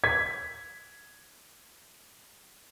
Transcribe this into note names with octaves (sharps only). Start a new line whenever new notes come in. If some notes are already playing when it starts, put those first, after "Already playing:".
G#6 B6